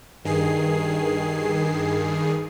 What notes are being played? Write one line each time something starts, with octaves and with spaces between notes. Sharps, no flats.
G2 D#3 G#4 C7